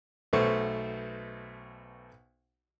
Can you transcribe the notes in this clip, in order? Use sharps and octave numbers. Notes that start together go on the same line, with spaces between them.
B1 B2 A3 C5 C#6